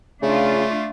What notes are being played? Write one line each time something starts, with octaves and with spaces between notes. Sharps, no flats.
C#3 A3 D4 F4